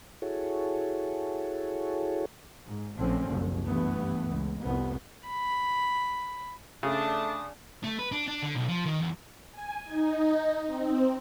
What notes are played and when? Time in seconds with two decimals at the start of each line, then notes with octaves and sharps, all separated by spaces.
0.22 E4 F#4 G#4 A4 C#5
2.66 G#2
2.96 A#1 A2 D3 F3 C4 C#4
3.28 F#1 C2
3.65 G2 E3 A3 B3
4.29 C#2
4.62 C2 F2 B3
5.28 B5
6.83 C#3 A3 D4 A5 D#6
7.84 A3
7.99 B4
8.12 D4
8.28 D4
8.42 D3
8.56 B1
8.69 F3
8.86 D#3
9.00 E2
9.52 G#5
9.85 D#4
10.66 C4